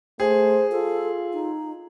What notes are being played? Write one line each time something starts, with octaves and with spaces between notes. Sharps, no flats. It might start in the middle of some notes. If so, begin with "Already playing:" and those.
A3 G#4 C5
F4 A4
D#4